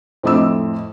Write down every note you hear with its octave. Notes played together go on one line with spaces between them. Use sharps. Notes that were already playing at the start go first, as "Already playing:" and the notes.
F2 A2 C5 D#5 D6 E6